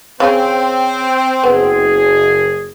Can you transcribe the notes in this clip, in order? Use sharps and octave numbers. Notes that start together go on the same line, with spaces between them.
C#3 C4 G#5
F#1 B3 G#4